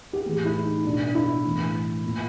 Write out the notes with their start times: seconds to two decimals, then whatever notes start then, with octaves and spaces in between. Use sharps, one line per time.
0.13 G4
0.25 A2 E3 G#4
0.45 E4
0.65 D#4
0.85 B2 D4
1.15 E4
1.44 A2 E3
2.04 A#2